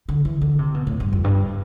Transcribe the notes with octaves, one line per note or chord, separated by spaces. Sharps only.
D3
E3
D3
C3
B2
A2
G2
F2
G2